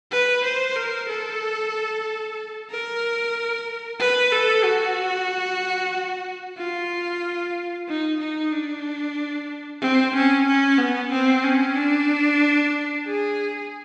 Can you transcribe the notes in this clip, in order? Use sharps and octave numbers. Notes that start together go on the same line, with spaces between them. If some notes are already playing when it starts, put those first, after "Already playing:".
B4
C5
A#4
A4
A#4
B4
A4
F#4
F4
D#4
D#4
D4
C4
C#4
C#4
B3
C4
C#4
D4
G#4